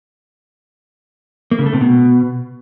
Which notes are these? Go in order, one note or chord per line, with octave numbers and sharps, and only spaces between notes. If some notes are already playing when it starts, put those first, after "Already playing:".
A#3
C#3
A3
C3
B2